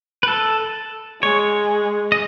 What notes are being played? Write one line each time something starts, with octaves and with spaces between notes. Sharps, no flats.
B4
A4
G#3 C#5
D#5